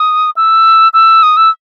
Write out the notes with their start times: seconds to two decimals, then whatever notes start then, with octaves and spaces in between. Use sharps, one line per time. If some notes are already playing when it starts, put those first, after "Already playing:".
Already playing: D#6
0.37 E6
0.94 E6
1.23 D#6
1.37 E6